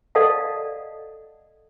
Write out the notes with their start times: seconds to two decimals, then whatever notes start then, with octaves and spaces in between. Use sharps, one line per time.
0.15 A4 D5 D#5 F5 F#5 A5